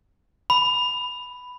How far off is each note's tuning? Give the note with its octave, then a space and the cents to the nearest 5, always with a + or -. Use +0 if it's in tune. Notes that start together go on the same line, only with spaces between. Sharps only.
B5 +5